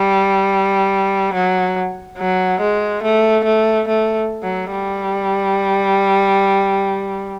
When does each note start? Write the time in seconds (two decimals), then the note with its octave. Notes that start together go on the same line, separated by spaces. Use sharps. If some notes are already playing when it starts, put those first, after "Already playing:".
Already playing: G3
1.34 F#3
2.18 F#3
2.61 G#3
3.03 A3
3.45 A3
3.88 A3
4.44 F#3
4.72 G3